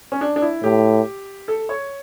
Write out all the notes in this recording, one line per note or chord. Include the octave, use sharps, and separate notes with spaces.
C#4
D4
D4
E4
A2 G4
A4
C#5